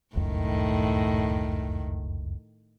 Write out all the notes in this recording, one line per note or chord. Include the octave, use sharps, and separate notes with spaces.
F1 C#2 F#2 A2 D#3